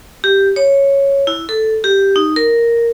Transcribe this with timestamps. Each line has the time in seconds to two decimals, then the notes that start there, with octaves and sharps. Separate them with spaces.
0.24 G4
0.56 C#5
1.27 E4
1.49 A4
1.84 G4
2.16 D#4
2.36 A#4